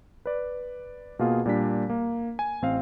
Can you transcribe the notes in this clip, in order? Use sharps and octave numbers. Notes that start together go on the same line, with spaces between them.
B4 D5
B2 A#3 F4 G#4
A#2 G3 D4 B6
A#3
G#5
A1 C4 F5